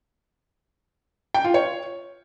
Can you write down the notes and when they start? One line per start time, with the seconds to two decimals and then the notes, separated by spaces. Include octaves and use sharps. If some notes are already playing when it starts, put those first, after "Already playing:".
1.34 G5
1.44 F4
1.54 C#5